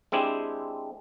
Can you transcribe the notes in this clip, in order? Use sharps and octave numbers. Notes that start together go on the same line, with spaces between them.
G#3 C4 D4 E4 G4